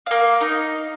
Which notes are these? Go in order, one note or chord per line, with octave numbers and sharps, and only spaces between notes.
A#3 F5
D#4